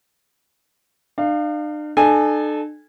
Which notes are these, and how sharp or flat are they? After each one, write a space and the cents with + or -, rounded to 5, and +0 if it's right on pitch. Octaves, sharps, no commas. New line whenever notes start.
D4 +45 F5 +0
D4 +45 A4 -20 G#5 -15